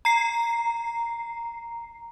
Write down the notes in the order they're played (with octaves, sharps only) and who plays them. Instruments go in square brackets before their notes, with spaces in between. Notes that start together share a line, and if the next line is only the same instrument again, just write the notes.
[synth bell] A#5 C7